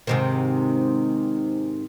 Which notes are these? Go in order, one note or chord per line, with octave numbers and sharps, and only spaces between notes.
G#2 C3 D#3